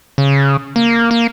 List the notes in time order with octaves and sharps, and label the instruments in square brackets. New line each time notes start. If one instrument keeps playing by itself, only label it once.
[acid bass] C#3
A#3
A#3